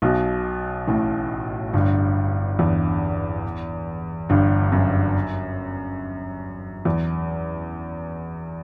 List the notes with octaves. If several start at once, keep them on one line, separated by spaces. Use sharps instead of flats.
B1 B2
A1 A2
G1 G2
E2
G1 G2
F#2
E2